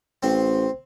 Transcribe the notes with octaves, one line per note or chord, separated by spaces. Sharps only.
A1 C4